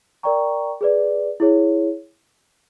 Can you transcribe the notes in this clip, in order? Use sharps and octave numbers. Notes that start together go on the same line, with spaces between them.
A#4 D5 G5 A#5 C#6
G#4 B4 D5
E4 G#4 C#5